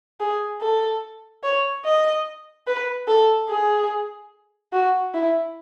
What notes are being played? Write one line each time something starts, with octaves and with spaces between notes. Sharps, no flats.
G#4
A4
C#5
D#5
B4
A4
G#4
F#4
E4